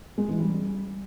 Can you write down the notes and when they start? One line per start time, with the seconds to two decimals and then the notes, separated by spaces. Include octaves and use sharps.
0.18 G#3
0.28 E3
0.39 G3